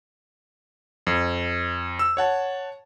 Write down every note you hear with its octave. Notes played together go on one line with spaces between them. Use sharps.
F2
E6
C#5 F#5 A5